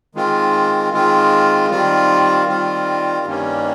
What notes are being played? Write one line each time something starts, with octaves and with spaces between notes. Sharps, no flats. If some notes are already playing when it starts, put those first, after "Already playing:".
D#3 G#3 C4 F4
D#3 G#3 C4 F4
D#3 G3 C4 F4
D#3 G3 C4 F4
G2 D#3 G3 A#3 C#4